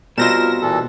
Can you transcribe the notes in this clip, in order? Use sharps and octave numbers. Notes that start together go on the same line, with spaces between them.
B2 G3 C4 D#4 F4 A#4 A#6 E7
A#2 E3 A4